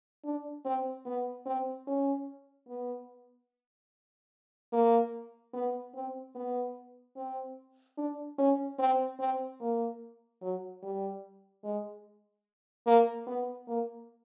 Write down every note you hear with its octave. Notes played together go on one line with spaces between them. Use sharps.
D4
C4
B3
C4
C#4
B3
A#3
B3
C4
B3
C4
D4
C#4
C4
C4
A#3
F#3
G3
G#3
A#3
B3
A#3